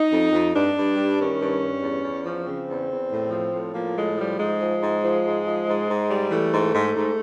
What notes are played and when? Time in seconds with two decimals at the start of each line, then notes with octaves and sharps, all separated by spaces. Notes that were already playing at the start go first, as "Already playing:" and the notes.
Already playing: D#4
0.11 F2
0.31 F2
0.53 G2 D4
0.75 G2
0.96 G3
1.18 D#3 C#4
1.39 G2
1.61 G2
1.81 E2
2.02 E2
2.25 F3
2.45 C#3 C4
2.67 E2
2.89 E2
3.10 A2
3.31 F3
3.52 A2
3.74 F3 A#3
3.95 A2 G#3
4.17 F3 G3
4.37 G#2 G#3
4.60 F3
4.80 G#2
5.03 F3
5.24 G#2
5.45 F3
5.67 G#2
5.88 G#2
6.09 G3
6.30 E3 A3
6.51 G#2
6.73 G#2
6.95 G#2